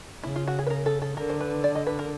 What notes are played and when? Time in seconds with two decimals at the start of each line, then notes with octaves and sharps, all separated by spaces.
0.23 C#3 E4
0.36 F4
0.47 F#4
0.59 G#4
0.67 B4
0.70 A#4
0.86 A4
1.02 A4
1.17 D3 A#4
1.29 C5
1.40 B4
1.64 D5
1.75 D#5
1.87 B4
1.99 A#4